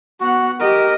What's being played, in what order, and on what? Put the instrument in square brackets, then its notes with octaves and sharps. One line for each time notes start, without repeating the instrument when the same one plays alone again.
[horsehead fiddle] B3 F#5 [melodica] F#4
[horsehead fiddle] G4 D#5 [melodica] A#4